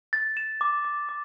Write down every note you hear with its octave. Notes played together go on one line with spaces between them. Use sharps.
A6
E7
D6
D6
D6